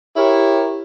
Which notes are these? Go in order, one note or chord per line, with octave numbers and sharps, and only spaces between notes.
E4 G4 A#4 C#5